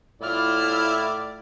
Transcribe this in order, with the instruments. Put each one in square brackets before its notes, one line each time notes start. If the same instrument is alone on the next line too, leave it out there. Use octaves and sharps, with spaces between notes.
[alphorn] A2 [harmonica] E4 D5 [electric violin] F4 F6